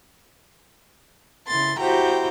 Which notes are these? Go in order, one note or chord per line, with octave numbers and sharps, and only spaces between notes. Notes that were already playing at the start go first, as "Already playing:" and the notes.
C#3 E4 C6 A6
E4 F#4 G4 C5 G5 A#5